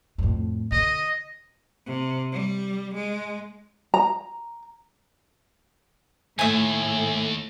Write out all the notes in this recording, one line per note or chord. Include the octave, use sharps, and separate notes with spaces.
F2 A2
D3 D#5
C3
G3
G#3
A#5
D#2 A2 E5 G#5